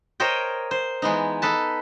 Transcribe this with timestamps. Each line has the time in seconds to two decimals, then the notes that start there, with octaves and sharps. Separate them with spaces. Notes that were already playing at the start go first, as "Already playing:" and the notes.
0.20 A#4 C5 C#5 D#5 G5
0.71 C5
1.02 E3 G#3 B3 D#4
1.42 D#4 A4 B4 A5